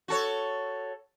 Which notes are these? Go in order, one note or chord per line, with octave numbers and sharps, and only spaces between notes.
F#4 A4 C#5